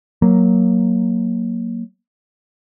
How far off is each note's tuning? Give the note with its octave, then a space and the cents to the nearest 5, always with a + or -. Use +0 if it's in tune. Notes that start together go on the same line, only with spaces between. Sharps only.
F#3 +0 A#3 +0